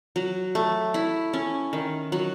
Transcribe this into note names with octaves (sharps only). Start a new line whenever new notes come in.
F#3
A3
E4
C#4
D#3
F#3